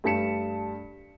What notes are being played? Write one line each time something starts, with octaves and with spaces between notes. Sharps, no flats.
G2 A3 A5 B6 C#7 E7